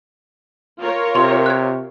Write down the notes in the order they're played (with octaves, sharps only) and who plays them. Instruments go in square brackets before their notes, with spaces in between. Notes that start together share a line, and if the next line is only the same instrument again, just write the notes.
[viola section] F4 A#4 C#5
[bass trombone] C3 [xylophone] C6
[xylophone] F#6 G#6